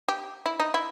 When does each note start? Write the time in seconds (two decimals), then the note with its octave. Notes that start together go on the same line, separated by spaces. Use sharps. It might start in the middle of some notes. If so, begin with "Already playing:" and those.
0.08 G4
0.46 E4
0.60 D#4
0.74 E4